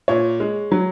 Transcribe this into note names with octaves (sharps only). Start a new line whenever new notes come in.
A#2 C#5
G#3
F#3